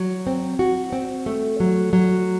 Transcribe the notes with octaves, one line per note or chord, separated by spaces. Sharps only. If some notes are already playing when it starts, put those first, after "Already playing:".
Already playing: F#3
C4
F#4
C4
A3
F#3
F#3